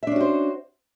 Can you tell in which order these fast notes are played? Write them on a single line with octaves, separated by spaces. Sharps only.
E5 D4 C#4 F#4 C5